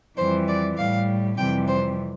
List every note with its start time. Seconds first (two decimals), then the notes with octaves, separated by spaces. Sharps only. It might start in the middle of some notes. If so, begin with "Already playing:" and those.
0.17 F2 E3 G3 C5
0.48 D5
0.77 A2 G3 F5
1.37 F2 C3 E3 G3 G5
1.68 C5